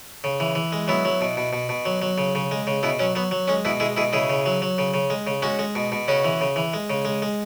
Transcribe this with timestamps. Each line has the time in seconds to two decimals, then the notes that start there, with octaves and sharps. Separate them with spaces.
0.24 C#3
0.40 E3
0.55 E3
0.72 G#3
0.88 F#3 B3 E4
1.05 F#3
1.21 B2
1.37 B2
1.53 B2
1.69 B2
1.85 F#3
2.02 F#3
2.18 C#3
2.35 C#3
2.51 G#3
2.67 C#3
2.83 B2 B3 E4
2.99 F#3 C#4
3.15 F#3 B3
3.31 F#3
3.48 G#3 C#4
3.65 B2 B3 E4
3.80 G#3 E4 G#4
3.97 B2 E4 G#4
4.13 C#3 E4 G#4
4.29 C#3
4.46 F#3
4.62 F#3
4.78 C#3
4.94 C#3
5.10 G#3
5.27 C#3
5.42 G#3 C#4 F#4
5.59 G#3
5.75 B2
5.92 B2
6.08 C#3 C#4 F#4
6.25 E3
6.41 C#3
6.56 E3
6.73 G#3
6.90 C#3
7.05 G#3
7.22 G#3